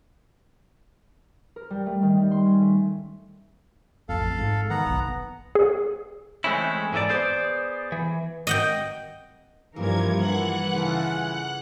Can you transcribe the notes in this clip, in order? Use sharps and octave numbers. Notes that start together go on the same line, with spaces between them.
A#4
G3
A3
D#3
G3
C6
C#4
A3
A1 F2 A4 F5
G#2
D#3 B3 F#5 A#5
F#1 B1
G#4
E3 G#3 A3 C4 C#4 E4
G#2 E3 A#3 A4 D5
B3 G#4 C5 D5
E3
D#5 F#5 G5
G2 E3 F3 A#3 A#4 G#6
E3 F#5 F#6
C#3 F4 A4